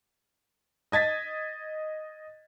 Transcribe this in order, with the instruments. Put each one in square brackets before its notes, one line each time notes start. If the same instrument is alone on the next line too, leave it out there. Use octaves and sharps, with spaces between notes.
[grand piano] D#5 G#6 A6 B6